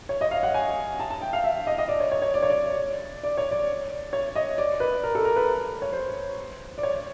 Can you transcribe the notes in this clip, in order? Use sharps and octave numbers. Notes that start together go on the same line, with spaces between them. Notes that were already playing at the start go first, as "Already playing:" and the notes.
C#5
D#5
F5
F#5
G#5
A5
A5
G5
F5
E5
D#5
D#5
D5
C#5
C#5
C#5
D5
C#5
D5
D5
C#5
D5
C#5
D#5
D5
B4
A#4
A4
A#4
B4
C#5
C5
D5
C#5